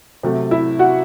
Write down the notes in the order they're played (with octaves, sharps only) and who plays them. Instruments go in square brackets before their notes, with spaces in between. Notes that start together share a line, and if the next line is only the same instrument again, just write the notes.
[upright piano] C3 F#3 A3
E4 E5
F#4 F#5